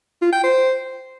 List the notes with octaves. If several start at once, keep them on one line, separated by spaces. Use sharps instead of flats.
F4
G5
C5